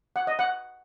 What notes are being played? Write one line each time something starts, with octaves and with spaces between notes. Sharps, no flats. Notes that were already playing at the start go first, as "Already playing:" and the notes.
F#5
D#5
F#5